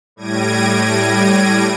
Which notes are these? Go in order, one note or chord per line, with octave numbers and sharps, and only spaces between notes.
A2 G3 G#6 A#6 D7 D#7